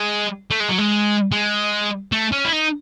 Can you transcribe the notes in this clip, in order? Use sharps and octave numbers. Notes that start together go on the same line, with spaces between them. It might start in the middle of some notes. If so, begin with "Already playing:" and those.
Already playing: G#3
A3
G#3
F#3
G#3
G#3
A3
C#4
E4
D#4